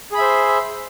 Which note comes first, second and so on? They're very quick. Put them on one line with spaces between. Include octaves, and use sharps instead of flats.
G#4 B5 E5 C5